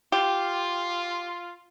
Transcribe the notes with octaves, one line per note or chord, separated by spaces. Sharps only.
F4 G4